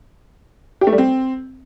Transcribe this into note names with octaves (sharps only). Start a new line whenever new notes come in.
G4
A3
G3
C4